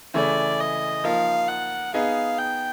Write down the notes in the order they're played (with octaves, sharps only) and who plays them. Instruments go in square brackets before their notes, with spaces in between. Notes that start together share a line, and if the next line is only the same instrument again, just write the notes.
[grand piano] C#3 E3 A3 [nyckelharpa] D5
[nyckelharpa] D#5
[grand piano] F3 A#3 D#4 [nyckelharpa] F5
[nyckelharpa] F#5
[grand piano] B3 D#4 G#4 [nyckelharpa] F5
[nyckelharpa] G5